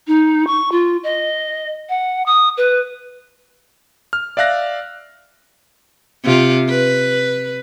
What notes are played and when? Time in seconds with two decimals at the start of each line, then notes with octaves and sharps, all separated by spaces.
0.07 D#4
0.47 C#6
0.72 F4
1.04 D#5
1.89 F#5
2.26 D#6
2.57 B4
4.13 F6
4.37 D5 E5 F5 F#6 A#6
6.24 C3 F4
6.69 B4